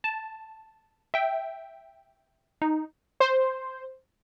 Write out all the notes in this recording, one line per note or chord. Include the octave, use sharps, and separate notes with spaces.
A5
E5 G5
D#4
C5